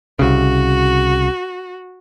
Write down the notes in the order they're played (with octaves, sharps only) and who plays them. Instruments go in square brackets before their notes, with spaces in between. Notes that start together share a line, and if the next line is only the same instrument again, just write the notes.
[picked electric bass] C2 C#3 [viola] F#4